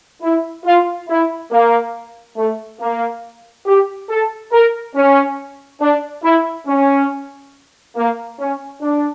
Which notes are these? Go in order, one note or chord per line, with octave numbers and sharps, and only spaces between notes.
E4
F4
E4
A#3
A3
A#3
G4
A4
A#4
C#4
D4
E4
C#4
A#3
C#4
D4